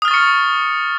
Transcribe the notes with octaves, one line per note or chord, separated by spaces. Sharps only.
C#6 D#6 F6 A6 C#7